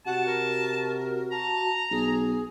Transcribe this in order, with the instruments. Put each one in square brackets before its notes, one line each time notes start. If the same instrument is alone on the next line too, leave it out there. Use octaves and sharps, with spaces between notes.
[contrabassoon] C3 [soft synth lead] F#4 [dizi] F#5 [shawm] A5
[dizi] A#4
[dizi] A5 [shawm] A#5
[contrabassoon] B1 [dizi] G#4